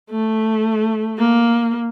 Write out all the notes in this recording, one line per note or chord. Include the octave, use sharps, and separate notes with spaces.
A3
A#3